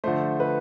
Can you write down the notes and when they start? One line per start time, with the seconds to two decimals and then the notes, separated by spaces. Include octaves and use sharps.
0.04 D3 F3 A3 C5
0.40 B4